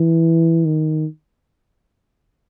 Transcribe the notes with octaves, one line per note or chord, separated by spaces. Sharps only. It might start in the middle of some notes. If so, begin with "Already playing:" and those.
Already playing: E3
D#3